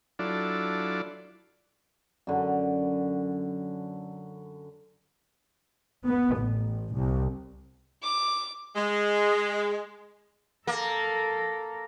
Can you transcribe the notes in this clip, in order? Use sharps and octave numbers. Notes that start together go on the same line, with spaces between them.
F#3 D4 E4 F4 A4 D5
F#2 D3
B3
A1
C2
D6
G#3
A#3 A4 A#4